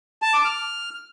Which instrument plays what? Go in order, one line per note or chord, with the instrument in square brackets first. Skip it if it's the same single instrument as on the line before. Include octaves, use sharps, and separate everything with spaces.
[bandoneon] A5
D6
F6